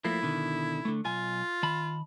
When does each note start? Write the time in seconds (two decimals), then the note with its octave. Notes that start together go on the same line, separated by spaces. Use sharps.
0.05 F3 A3 A#3 E4
0.22 B2 D3 D#3
0.85 D3 A3
1.05 B1 F4 G#5
1.63 D#3 A5 B5